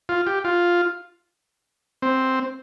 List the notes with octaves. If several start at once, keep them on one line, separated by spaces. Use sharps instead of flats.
F4
G4
F4
C4